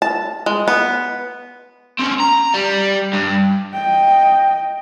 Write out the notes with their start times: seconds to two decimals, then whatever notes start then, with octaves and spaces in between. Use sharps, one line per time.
0.02 A5
0.46 G#3
0.68 B3
1.99 C4 C#4
2.20 A#5
2.54 G3
3.13 G2
3.74 D#5 G5